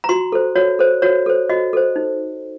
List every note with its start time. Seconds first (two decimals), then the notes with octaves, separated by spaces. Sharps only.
0.04 A#5
0.09 F#4 C6
0.32 A4 C5
0.55 F#4 C#5
0.79 A4 C5
1.02 F#4 C#5
1.26 A4 C5
1.49 F#4 D#5
1.73 A4 C5
1.96 D#4